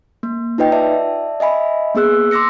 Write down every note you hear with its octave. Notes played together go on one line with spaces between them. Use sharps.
A#3
D#4 F4 B4 D#5 G5
D5 E5 A5
D#5 E5 G#5 B5
A#3 B3 G#4 E6 F#6
C6 D6 E6 A#6 C#7